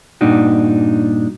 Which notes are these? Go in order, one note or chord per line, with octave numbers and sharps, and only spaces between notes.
G2 A#2 D4 D#4 F#4